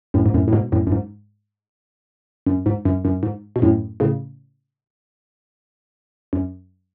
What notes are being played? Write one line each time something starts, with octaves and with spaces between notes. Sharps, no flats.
F#2 A2
G#2
F#2 A2
A2
G#2 B2
F#2 A2
F#2
G#2
F#2
G#2
F#2
F#2
G#2
B2
F#2 A2
A2 C#3
F#2